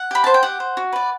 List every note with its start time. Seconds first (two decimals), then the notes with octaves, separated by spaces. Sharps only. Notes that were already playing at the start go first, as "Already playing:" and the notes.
Already playing: F#5
0.11 G4 B5
0.24 C5 A5
0.34 G5
0.43 G4 F#5
0.60 C5
0.77 F#4
0.93 B4 D5